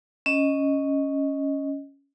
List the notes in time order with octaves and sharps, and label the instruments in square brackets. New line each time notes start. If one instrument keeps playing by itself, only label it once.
[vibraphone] C#4 D#5